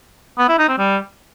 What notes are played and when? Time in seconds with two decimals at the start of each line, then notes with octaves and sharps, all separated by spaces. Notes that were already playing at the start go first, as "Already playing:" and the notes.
0.39 B3
0.49 E4
0.58 D#4
0.68 C4
0.78 G3